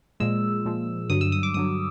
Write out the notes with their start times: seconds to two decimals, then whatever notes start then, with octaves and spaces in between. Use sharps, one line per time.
0.20 A#2 F3 G#3 E6
0.65 A#2 F3 G#3
1.10 G2 D3 F#3 D#6
1.21 E6
1.32 D#6
1.43 D6
1.54 G2 D3 F#3 D#6